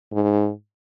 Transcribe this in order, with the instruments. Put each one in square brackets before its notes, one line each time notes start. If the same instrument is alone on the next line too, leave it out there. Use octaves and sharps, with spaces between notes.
[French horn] G#2